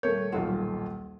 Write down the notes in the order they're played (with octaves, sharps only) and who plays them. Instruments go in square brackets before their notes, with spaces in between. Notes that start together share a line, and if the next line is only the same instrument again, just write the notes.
[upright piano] D#1 A3 C#5 [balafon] A#4
[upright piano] D#1 B1 F4 [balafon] F#5